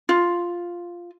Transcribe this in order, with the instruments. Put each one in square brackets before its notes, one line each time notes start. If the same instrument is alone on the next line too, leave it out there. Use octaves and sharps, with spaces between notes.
[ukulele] F4